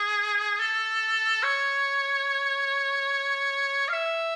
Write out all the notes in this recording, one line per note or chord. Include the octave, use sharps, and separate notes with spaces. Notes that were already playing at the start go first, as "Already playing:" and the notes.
Already playing: G#4
A4
C#5
F5
E5